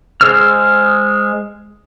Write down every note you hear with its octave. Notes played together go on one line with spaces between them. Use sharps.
G#3 G#4 C5 E6 F6